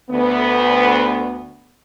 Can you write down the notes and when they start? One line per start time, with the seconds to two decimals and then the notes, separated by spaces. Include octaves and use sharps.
0.11 D2 B3